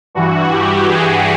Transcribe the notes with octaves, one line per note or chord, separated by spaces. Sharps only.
G2 E3 F#4
G4
G#4